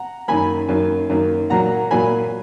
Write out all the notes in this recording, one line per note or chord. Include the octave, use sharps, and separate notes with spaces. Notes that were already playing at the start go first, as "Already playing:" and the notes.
Already playing: F#5 A#5
F#2 D#3 A#3 G#5 B5
F#2 D#3 A#3
F#2 D#3 A#3
A#2 F#3 A#3 F#5 A#5
A#2 F#3 A#3 G#5 B5